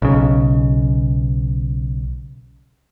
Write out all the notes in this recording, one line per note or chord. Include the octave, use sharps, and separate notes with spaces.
B1 C#3